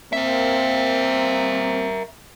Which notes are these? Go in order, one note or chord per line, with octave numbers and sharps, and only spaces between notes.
A#3 C4 A#4 E5